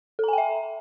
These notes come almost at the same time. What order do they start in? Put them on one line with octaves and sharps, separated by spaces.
A4 A#5 G#5 G5 E5